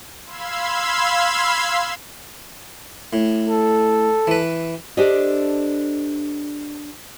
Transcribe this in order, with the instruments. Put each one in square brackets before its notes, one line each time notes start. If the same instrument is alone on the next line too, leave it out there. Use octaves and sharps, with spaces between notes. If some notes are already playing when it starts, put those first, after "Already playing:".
[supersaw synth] F5 B5 C6 E6 G#6
[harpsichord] A2
[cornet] A4
[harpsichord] E3 B4
[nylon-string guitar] D4 G4 A4 C5 D5 D#5